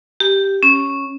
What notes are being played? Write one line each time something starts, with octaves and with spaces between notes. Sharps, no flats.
G4
C#4